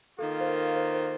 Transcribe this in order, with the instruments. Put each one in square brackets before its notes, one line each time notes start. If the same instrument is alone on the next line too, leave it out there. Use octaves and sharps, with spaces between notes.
[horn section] D#3 A#3 F4 [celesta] A4
[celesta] C5
A#4
C5
C5